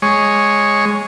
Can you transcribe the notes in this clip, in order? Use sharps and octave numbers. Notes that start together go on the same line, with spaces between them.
G#3 C#5